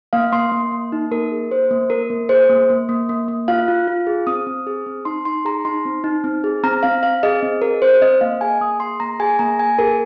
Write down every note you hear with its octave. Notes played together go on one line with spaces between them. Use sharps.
A#3 F5
A#3 C6
A#3
A#3
D#4
A#3 A#4
G#4
A#3 C5
A#3
A#3 A#4
A#3
G#4 C5
A#3
A#3
A#3
A#3
A#3
F4 F5
F4
F4
G#4
C4 D#6
C4
G#4
C4
D#4 C6
D#4 C6
G#4 A#5
D#4 C6
C4
D#4
C4
G#4
C4 A#5
C4 F5
C4 F5
G#4 D#5
C4
G#4 A#4
C4 C5
C4 D#5
A#3 F5
G#4 G#5
A#3 D#6
G#4 C6
A#3 A#5
G#4 G#5
A#3 A#5
A#3 G#5
G#4 A#4